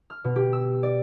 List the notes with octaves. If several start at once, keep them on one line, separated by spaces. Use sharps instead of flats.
F6
B2
G4
E6
D5